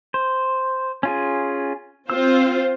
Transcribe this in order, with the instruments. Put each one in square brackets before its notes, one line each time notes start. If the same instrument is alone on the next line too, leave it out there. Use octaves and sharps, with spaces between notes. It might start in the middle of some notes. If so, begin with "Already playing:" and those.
[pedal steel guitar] C5
C#4 F4 G#4
[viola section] C4 F4 C5 [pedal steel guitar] E6